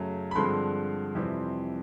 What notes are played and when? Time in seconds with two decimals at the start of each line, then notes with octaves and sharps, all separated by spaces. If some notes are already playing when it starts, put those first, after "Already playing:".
Already playing: F#2 C#3 F#3 A3
0.31 B5
0.36 G2 D3 F3 G#3 C4 C6
1.15 F2 C3 E3 G3 C4